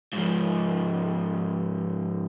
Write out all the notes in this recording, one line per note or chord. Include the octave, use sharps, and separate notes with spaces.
G#2 F3